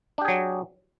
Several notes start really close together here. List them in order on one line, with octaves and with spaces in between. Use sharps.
D4 G4 G#4 F#3